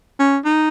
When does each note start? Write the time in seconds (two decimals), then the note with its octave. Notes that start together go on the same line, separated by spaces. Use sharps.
0.19 C#4
0.45 D#4